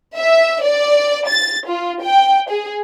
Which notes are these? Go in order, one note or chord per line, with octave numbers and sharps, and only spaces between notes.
E5
D5
A6
F4
G5
G#4